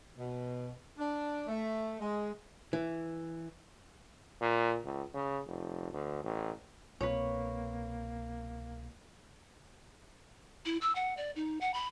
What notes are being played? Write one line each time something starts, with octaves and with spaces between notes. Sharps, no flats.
B2
D4
A3
G#3
E3
A#2
C#2
C#3
F1
D2
A1
C2 B2 A#3 C4 B4 C#5
E4
E6
F#5
D5
D#4
F#5
B5